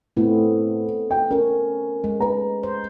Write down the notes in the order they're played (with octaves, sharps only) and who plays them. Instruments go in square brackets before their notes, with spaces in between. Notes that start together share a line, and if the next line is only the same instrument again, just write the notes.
[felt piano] A2 [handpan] A3 B3 C4
[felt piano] G5
[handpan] C#4 [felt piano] A#4
[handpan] G#3
[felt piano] B4 A#5
[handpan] C5